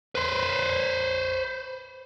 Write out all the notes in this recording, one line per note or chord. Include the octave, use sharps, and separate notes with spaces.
B4 C5